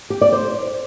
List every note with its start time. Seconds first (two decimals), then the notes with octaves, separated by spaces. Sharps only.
0.10 G4
0.21 D5
0.33 C5